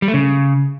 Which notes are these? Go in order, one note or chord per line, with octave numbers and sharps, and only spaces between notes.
G3
A3
C#3